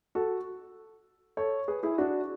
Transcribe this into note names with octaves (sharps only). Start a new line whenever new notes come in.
F#4 A4
A4 C#5
G#4 B4
E4 G#4
D4 F#4